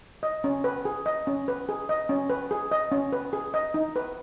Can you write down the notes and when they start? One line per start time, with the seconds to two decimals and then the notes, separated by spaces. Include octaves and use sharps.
0.23 D#5
0.44 C#4
0.64 B4
0.85 G#4
1.06 D#5
1.27 C#4
1.48 B4
1.69 G#4
1.89 D#5
2.09 C#4
2.30 B4
2.51 G#4
2.71 D#5
2.92 C#4
3.13 B4
3.33 G#4
3.54 D#5
3.74 D#4
3.96 B4